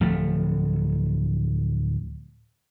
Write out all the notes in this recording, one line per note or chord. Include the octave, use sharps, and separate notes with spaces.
D1 F3 A3